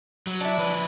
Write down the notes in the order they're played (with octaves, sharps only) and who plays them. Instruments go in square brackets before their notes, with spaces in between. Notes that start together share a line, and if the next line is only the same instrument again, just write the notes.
[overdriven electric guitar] F#3 [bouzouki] B4
[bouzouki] D4 E4
[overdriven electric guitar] F3 B4